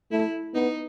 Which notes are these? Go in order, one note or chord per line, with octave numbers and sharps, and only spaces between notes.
A3 E4
B3 D#4